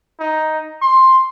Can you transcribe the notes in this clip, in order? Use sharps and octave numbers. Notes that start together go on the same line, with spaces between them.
D#4
C6